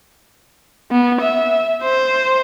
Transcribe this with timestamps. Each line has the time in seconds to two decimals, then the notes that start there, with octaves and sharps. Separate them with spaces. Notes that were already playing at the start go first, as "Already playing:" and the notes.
0.91 B3
1.21 E5
1.84 C5